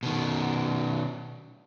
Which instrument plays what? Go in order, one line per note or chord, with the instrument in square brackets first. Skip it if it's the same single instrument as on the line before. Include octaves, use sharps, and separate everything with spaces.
[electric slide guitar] B2 D#3